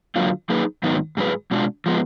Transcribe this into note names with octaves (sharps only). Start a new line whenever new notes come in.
F#2 D3 F#3 A#3 F4
F#3 A#3 D#4 G#4 B4
G#2 D#3 F#3 B3 D#4
G#2 F#3 D4 G#4 B4
B2 G#3 D4 F4
F3 G#3 B3